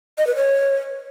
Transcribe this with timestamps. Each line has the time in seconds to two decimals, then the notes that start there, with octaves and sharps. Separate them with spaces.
0.18 D#5
0.27 B4
0.36 C#5